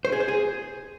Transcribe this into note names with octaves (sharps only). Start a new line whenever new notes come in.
C5
G#4
C5
G#4